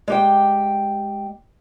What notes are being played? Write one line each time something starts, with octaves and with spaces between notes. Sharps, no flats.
G#3 G4 G5